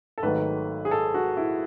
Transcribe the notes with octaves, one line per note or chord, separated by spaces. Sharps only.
A4
G#1 G#2 D#3 F#3 A3 B4
G#4
A4
F#4
E4